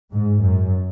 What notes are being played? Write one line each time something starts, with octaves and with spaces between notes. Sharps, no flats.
G#2
F#2